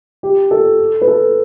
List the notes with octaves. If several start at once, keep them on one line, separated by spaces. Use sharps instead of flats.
G4
A4
B4
A4